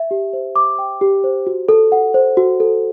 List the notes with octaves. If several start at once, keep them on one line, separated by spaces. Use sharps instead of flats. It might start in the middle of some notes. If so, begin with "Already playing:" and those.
Already playing: E5
G4
C5
D6
G5
G4
C5
F#4
A4
F#5
C5
F#4
A4